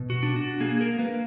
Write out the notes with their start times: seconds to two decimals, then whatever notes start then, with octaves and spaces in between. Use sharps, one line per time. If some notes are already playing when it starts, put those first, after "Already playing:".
Already playing: B2
0.10 F#4
0.23 D4
0.36 F#4
0.60 A#3 G#4
0.81 A#4
0.99 A#3 B4